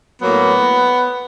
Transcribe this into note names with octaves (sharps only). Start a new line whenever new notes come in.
A2 F#3 A#3 B3